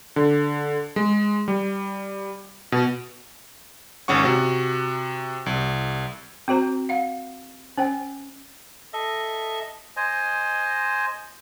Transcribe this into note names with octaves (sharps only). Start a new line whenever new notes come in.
D3
G#3
G3
B2
G#1 C#3 C#4 F#5 C#6
C3 F#4
C2
C4 F#4 C5 A#5
F5 F#5
C#4 C5 G5
A4 D#5 E5
C5 D#5 G#5